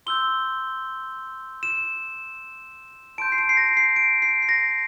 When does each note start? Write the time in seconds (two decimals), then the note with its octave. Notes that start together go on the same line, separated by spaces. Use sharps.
0.06 C6 E6 G6 G7
1.63 E7
3.18 A5 C6 G6 D7
3.32 C7
3.38 D7
3.49 C7
3.57 A#6
3.77 C7
3.96 D7
4.22 C7
4.42 C7
4.49 A#6